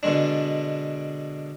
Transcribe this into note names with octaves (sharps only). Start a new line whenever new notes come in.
B2 D3 G#3 D4